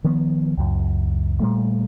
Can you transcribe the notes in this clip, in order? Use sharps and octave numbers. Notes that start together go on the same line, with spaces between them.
D#3 F3 B3
C#2 F#2
A#2 G3 A3